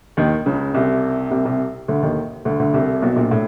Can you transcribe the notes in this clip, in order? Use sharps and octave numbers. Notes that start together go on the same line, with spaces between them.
D#2 D#3
C#2 C#3
C2 C3
C2 C3
C2 C3
D2 D3
D#2 D#3
D2 D3
D2 D3
C2 C3
B1 B2
A#1 A#2
A2